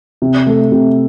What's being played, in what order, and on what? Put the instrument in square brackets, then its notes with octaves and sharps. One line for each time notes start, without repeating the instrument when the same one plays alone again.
[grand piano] C3
A3
C3